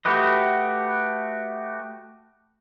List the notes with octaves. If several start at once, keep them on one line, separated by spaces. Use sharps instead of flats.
A3 F#4 G4 B4 D#5